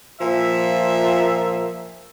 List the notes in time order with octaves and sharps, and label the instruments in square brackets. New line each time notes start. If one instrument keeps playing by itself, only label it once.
[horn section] A#2 F3 E5